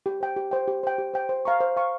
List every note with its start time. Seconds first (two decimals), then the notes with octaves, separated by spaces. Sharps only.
0.06 G4
0.21 C5 G5
0.36 G4
0.51 C5 G5
0.68 G4
0.83 C5 G5
0.98 G4
1.14 C5 G5
1.29 C5
1.45 F5 A#5 C#6
1.60 C5
1.76 F5 A#5 C#6